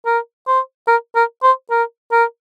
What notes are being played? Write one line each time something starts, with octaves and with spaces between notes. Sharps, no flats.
A#4
C5
A#4
A#4
C5
A#4
A#4